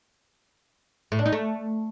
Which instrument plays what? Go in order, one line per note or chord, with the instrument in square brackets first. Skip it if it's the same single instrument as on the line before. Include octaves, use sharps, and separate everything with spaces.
[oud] A2
D4
D#4
A3